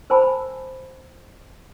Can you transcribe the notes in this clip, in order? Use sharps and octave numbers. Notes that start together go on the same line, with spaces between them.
A#4 C5 G#5 A5 B5